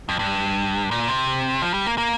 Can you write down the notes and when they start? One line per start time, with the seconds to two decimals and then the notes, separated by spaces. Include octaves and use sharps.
0.09 F2
0.19 G2
0.91 A#2
1.08 C3
1.62 F3
1.74 G3
1.87 A#3
1.98 A#3